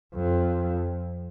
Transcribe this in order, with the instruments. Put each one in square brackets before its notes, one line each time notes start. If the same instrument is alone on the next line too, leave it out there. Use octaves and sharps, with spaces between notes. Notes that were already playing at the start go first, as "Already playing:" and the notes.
[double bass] F2